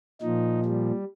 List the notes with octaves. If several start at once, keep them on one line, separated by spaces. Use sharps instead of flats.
A#2 F3 D#4
G3